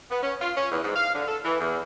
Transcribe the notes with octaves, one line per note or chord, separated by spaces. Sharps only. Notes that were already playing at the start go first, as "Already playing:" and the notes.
B3
C#4
F4
C#4
E2
G#2
F5
D3
A4
E3
E2